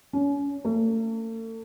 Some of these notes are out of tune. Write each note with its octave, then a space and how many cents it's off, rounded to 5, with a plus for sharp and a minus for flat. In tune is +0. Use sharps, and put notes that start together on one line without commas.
C#4 +35
A3 +45